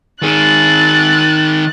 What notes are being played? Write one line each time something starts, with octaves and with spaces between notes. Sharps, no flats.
D#3 G#4 F#6 A6